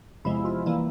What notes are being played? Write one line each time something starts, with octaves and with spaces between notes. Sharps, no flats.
E2 C3 F3 G#3 E4
F4
E3 G3 A#3 E4